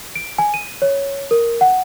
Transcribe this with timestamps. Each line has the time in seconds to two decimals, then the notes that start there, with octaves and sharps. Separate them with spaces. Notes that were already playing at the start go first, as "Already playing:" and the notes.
0.15 D7
0.38 G#5
0.54 D#7
0.82 C#5
1.31 A#4
1.61 F#5